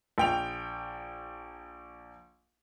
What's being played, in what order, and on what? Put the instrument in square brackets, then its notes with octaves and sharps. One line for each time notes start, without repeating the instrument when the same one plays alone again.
[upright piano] A#1 G5 F7